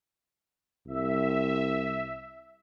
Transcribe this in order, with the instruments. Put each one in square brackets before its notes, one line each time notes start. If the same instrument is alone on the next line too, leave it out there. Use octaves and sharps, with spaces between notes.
[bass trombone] C2 [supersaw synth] E5